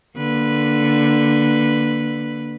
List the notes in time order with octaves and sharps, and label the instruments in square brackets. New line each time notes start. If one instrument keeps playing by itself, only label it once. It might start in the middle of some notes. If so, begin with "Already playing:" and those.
[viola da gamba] D3 A#3 B4